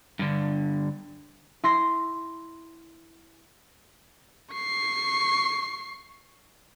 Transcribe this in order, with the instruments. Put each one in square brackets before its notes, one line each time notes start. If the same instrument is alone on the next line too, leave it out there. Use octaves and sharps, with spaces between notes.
[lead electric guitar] G2 D3
[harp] E4 C6 A#6 C7
[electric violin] C#6 C7